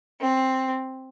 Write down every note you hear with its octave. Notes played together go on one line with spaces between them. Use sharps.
C4